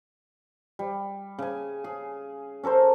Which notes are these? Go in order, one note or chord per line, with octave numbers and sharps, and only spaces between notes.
G3
C#3 G#5
G#4
C#4 A4 A#4 C5